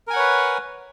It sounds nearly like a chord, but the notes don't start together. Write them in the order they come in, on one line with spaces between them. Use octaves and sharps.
A#4 G#5 F#5 C#5 B4